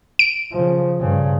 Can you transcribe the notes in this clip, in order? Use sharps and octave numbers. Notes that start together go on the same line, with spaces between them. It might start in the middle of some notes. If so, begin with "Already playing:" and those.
D7
C#3 F3
G2 C#3